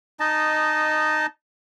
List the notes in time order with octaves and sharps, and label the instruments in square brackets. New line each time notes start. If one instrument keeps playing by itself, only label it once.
[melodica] D#4 D#5 A5